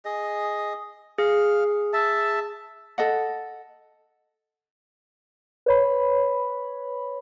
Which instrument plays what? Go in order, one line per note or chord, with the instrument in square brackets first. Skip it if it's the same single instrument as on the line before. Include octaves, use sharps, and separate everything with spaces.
[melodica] G#4 D#5
[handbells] G#4 [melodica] F5
[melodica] E5 A5
[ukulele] A4 D#5 F#5
[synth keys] B4 C#5 B5